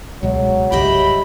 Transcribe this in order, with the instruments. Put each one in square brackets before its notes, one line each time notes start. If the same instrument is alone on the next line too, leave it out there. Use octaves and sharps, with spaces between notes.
[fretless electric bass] C#2 B2 G#3 [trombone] F#3
[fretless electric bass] C2 G2 C#3 [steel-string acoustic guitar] G4 D#5 E5 [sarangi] B5